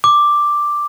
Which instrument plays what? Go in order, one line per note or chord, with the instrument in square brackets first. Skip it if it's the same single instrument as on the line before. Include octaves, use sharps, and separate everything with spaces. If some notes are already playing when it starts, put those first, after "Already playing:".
[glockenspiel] D6